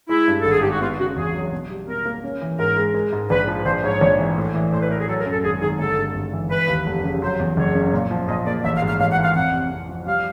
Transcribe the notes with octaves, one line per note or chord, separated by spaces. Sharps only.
G#3 E4
G2
G#1 A4
G#4
D#3 G4
F#4
B3 F4
C#3 F#4
E2 G#4
F#3
B2
G3
B2 A#4
A#3
C#4
E3
G#2 A#4
G#3
G#3
G#2
A#1 B4
F3
A#1 C5
G#2 C#5
A#1
E3
A2
E3
A2 C5
B4
A3 A#4
G#4
F#3 A4
A#4
F#2
A4
G#1 G#4
D#3 G#4
G1 A4
G2
G1
E3
E3 B4
D#2
F1
C#3
F#3 C5
E2
F#1 C#5
C#3
A#2
F3
A#2 D#5
A#3 D5
A1 E5
F5
G#2
F5
A1 F5
F#5
E3
F5
F2 F#5
C3
F2
F3
G3 F5